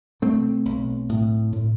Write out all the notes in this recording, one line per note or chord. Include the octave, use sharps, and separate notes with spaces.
B2 A3 C4
B1
A2
A2